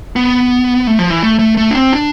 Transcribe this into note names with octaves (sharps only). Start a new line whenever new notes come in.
B3
A3
F3
E3
A3
A3
A3
D4
C4
D4